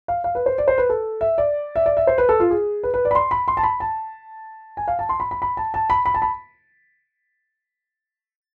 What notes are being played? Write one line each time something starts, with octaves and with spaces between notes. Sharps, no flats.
F5
F5
B4
C5
D5
C5
B4
A4
E5
D5
E5
D5
E5
C5
B4
A4
F4
G#4
B4
B4
D5
B5
C6
B5
C6
A5
B5
A5
G#5
F5
A5
C6
B5
B5
B5
A5
A5
B5
B5
A5
B5